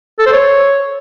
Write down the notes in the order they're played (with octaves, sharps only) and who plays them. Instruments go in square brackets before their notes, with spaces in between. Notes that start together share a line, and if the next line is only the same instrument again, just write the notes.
[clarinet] A4
C5
C#5